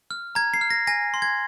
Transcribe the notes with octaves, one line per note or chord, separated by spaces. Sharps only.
F6
A#5 G#6
C7
F6
A#6
G#5 A#6
C6
G#6